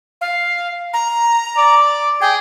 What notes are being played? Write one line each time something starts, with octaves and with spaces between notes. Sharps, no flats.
F5
A#5
D5
G#4 G5